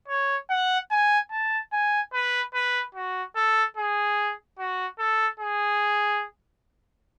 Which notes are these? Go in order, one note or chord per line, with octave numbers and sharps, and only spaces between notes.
C#5
F#5
G#5
A5
G#5
B4
B4
F#4
A4
G#4
F#4
A4
G#4